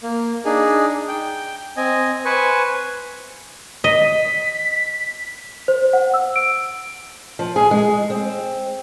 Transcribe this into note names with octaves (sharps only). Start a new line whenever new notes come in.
A#3
D4 D#4 G#4
G5
C4 D#5 G#5
B4 C5 G#5 C#6
D#5 B6
C5
F#5
E6
D7
F3
G#4
G#3
C4